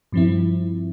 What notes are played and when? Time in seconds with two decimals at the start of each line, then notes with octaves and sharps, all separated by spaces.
0.12 G2 F3 C4 E4